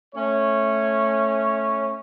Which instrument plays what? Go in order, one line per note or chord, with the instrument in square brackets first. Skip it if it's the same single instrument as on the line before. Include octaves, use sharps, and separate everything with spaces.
[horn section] A3 C#4 C#5